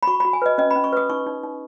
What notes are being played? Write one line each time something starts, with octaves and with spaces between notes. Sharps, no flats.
B5
F#4 C#6
F#4 B5
G#5
B4 D#5
C#4 D#5
B5
C#4
C#6
B4 D#6
D#4 C#6
D#4
D#4